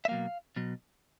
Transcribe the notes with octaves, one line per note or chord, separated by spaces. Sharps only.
E5
B2 F#3 A#3 F5
B2 F#3